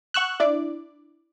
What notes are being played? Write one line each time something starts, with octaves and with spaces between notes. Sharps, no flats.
F#5 C#6 E6 F#6
D4 E4 D5